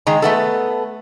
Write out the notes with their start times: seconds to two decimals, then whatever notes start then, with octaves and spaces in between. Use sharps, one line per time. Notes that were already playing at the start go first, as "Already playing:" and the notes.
0.07 D#3 G#3 A#5
0.22 A3 B3 A4